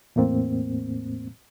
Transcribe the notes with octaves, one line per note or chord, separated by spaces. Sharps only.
E2 A2 A#3 C4